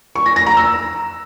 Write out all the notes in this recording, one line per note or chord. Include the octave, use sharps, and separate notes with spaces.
C#6
A#6
A#6
A#5
E6